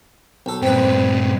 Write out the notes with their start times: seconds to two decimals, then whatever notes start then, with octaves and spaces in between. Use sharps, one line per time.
0.46 B1 A4
0.62 G2 A#2 C4 B4